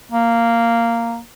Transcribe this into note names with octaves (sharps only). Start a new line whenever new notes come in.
A#3